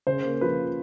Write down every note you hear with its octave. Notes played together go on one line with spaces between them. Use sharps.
C#3 C5
A#3
F3 B4